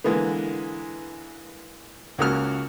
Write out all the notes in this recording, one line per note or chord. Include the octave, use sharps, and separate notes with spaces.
D3 E3 G#3 A#3 B3
C#2 C#3 A#3 C#4 F#4 F6